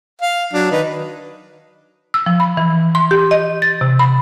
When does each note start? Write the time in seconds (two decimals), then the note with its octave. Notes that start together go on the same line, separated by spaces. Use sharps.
0.22 F5
0.53 F#3 D4
0.71 D#3 D#4 B4
2.14 E6
2.26 F3
2.40 B5
2.57 E3
2.95 C6
3.11 G4
3.31 D#5
3.62 A6
3.81 C3
3.99 B5